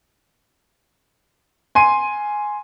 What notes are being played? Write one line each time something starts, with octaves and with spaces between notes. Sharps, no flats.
G#5 C6 D#7